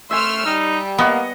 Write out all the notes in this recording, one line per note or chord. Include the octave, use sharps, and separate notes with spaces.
A3 E5 G#5 C6 E6 F6
G3 D#4
A#3 B3 D#5 F#5 C#6